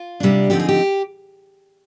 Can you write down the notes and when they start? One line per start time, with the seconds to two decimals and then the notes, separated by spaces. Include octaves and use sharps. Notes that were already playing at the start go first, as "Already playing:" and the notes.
Already playing: F4
0.20 C3 G3 D4
0.50 D3 F3 C4 D#4 G4
0.60 G#4
0.68 G4